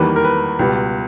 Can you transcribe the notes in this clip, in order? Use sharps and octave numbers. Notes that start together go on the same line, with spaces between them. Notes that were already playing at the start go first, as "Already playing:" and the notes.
Already playing: E2 D#3 G3 A#3 B4
A#4
B4
C#2 B2 G3